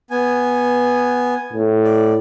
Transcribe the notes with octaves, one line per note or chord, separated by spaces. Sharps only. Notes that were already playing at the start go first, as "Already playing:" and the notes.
B3 G#5
A2
D5